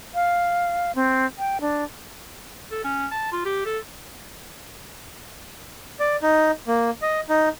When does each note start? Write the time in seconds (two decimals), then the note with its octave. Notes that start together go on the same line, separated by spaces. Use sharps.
0.14 F5
0.95 C4
1.38 G5
1.61 D4
2.71 A4
2.84 C#4
3.12 A5
3.32 F4
3.45 G4
3.66 A4
6.00 D5
6.22 D#4
6.67 A#3
7.02 D#5
7.29 D#4